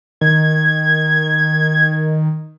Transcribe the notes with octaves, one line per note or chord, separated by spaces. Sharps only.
D#3 G#6